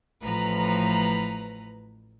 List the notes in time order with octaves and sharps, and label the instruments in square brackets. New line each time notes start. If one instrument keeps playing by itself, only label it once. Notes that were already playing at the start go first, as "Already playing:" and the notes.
[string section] A1 A2 F3 B4 A#5